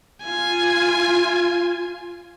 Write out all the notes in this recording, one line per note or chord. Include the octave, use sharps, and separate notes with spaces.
F4 G#5